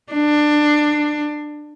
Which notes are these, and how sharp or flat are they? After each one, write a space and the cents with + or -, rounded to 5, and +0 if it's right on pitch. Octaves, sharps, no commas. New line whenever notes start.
D4 +20